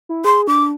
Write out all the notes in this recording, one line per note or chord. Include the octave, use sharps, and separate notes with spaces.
E4
G#4 C6
D4 D6